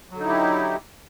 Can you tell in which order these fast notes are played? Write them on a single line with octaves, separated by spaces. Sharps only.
F#3 D3 D#4 E4 G4